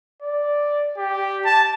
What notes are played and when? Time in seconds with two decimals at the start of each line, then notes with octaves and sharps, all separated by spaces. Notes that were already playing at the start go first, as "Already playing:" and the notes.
0.22 D5
0.97 G4
1.45 A5